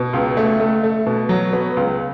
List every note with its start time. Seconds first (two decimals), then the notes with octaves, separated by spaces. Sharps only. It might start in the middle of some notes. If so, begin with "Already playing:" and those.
Already playing: B2
0.13 C#2
0.37 A3
0.60 A3
0.83 A3
1.06 B2
1.29 F#3
1.53 B3
1.77 C#2